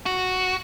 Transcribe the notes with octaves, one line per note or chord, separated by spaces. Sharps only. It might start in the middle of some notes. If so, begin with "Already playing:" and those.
F#4